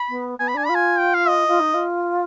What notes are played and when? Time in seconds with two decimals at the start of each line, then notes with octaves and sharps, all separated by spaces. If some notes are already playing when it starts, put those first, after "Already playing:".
Already playing: B5
0.09 B3
0.39 B3 G#5
0.48 B5
0.54 D4 G#5
0.66 F4 B5
0.75 G#5
0.99 G5
1.14 F5
1.29 D#5
1.48 F4
1.59 D#4
1.74 F4